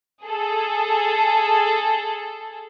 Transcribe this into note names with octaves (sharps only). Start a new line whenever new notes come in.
G#4 A4